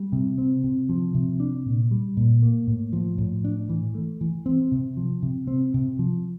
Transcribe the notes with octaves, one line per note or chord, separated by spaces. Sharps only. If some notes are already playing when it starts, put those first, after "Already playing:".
Already playing: G3
C3
C4
C3
F3
C3
D4
A#2
G3
A#2
A#3
A2
F3
A2
D4
E3
A3
E3
C4
C3
F3
C3
C4
C3
F3